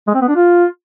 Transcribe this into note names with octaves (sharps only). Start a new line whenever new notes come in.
G#3
C4
B3
D4
F4